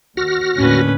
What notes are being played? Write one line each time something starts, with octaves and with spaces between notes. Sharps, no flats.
D#2 F#4 F6 A#6
D#2 A2 D3 C#4 B4